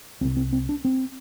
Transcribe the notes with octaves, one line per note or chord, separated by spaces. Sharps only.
C2 C3 C4
C4
C4
D4
C4